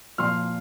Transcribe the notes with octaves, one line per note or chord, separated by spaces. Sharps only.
A#2 F3 C6 F6